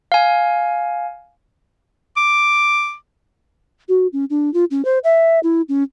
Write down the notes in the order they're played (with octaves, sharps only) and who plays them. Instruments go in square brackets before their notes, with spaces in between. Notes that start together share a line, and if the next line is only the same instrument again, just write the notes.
[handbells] F5 G#5
[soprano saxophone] D6
[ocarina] F#4
C#4
D4
F4
C#4
C5
E5
E4
C#4